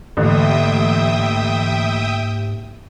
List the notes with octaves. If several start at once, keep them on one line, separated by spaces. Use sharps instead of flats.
A1 G#2 D3 A#3 G4 E5 G5 D#6